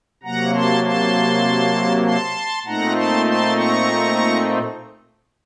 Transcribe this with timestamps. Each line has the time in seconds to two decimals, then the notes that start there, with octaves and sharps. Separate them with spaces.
0.23 C3 F#3 A#3 F#5 A#5
0.54 A5 C6
0.84 A5 C6
2.04 A5 C6
2.65 A#2 A3 C4 D#4 F#5 A#5
2.95 A5 C6
3.26 A5 C6
3.56 A#5 C#6